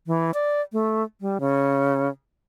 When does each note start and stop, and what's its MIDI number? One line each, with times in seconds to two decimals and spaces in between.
0.07 0.31 52
0.34 0.61 74
0.73 1.03 57
1.21 1.38 55
1.40 2.09 49